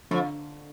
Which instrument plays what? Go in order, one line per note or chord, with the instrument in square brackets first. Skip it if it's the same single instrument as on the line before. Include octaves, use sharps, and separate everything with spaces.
[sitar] F2 [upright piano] D3